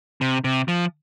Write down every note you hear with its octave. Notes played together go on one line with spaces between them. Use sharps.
C3
C3
F3